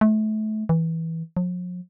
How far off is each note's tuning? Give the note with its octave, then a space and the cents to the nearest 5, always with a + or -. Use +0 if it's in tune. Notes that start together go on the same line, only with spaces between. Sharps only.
A3 -30
E3 -15
F3 +45